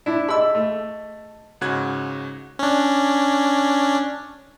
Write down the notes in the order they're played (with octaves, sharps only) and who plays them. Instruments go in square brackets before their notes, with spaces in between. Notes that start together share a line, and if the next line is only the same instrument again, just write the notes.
[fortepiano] D4 E4
[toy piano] G#4 D#5 [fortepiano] B5 E6
[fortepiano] A3
[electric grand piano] G#2 C#3 F#4 F#6 G#6
[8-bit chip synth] C#4 D4